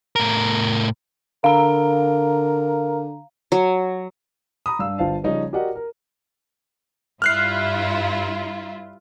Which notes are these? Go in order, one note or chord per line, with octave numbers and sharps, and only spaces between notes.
A2 A#4
D3 A#4 F5 A#5
F#3
A#5 B5 D#6
G2 D4 F5 E6
G1 F4 C5 F5 A5
C#3 F3 G3 C#4 D#4
F#4 G4 A#4 D5 D#5 F#5
A#4
G2 E4 F4 F6 F#6 C7